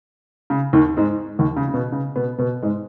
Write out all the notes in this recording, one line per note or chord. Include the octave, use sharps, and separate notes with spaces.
C#3
D#2 D#3
G#2 G#3
D#2 D#3
C#3
C#3
B2
C#3
B2 B3
B2 B3
G#2 G#3